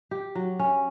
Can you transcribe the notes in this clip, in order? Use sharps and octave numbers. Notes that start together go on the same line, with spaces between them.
G4
F#3
C#4